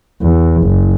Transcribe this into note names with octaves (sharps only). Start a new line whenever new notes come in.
E2
F#1